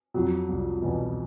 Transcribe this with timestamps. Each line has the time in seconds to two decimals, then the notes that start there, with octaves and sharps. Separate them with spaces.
0.14 F2 F#3
0.48 C2
0.82 E2 B2